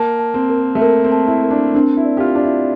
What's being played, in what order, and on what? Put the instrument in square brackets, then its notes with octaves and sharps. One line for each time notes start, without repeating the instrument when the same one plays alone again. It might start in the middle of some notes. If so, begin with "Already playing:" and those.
Already playing: [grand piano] A#3 [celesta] A5
[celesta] A5
[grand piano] C4
[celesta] A#4
[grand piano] A3
[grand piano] A#3 [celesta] A#4
[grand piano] C4
[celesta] A5
[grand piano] E4
[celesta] A#4
[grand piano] D4
[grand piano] C4 [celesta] D4
[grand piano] E4
[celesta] D5
[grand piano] G4
F4
[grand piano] D4 [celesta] D5
[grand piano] E4